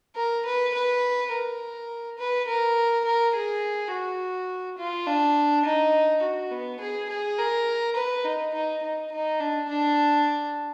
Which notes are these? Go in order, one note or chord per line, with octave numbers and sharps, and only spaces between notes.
A#4
B4
B4
A#4
B4
A#4
A#4
G#4
F#4
F4
D4
D#4
F#4
B3
G#4
G#4
A#4
B4
D#4
D#4
D#4
D#4
D4
D4